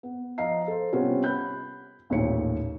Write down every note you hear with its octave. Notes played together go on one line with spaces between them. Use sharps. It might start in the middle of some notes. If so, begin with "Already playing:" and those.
B3
F3 D#5 F5 A#5 C7
A4 C5
C3 G3 B3 C#4 F4
B5 F#6 G6
A1 D#2 A#2 C#5 C#7